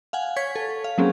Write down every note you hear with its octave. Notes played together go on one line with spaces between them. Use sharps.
F5 F#5 G#5
C#5 C#6 G#6 B6
A4
F5
F#3 A#3 C4 C#4 G#4